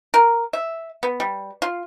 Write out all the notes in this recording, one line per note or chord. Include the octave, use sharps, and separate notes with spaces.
A#4
E5
B3
G3
F4